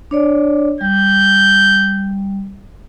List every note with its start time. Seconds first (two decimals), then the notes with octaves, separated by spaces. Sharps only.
0.11 D4 C#5 D5
0.81 G3 G6